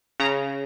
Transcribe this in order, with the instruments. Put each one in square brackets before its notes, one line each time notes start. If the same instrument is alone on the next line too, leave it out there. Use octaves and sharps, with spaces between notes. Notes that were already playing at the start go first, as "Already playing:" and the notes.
[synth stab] C#3 A#5